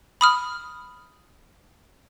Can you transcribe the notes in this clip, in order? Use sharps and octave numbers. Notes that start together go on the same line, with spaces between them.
B5 D#6 F6